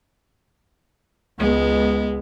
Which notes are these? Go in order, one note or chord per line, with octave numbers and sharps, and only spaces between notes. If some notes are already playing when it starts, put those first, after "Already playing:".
C#2 G#3 B3